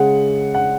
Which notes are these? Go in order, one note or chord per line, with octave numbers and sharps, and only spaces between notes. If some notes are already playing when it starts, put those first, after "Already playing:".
Already playing: C#3 G#3 F#5
F#5